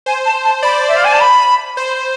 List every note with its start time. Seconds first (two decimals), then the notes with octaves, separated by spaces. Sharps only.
0.06 C5 G#5
0.25 A5
0.44 A5
0.63 D5 B5
0.87 E5
0.96 F5
1.04 G#5
1.12 A5
1.20 B5
1.77 C5